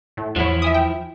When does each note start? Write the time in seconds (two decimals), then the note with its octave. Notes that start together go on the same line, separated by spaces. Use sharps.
0.17 A2
0.36 E2 F3 B3 E4 C#5
0.62 E5 G#5 D#6
0.74 G5